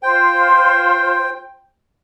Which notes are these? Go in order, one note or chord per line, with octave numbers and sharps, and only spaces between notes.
F4 C5 G5 C6